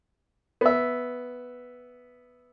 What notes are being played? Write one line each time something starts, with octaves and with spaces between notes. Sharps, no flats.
B3 E5